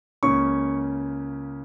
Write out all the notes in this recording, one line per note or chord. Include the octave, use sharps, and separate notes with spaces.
C#2 C#3 A#3 C#4 C#6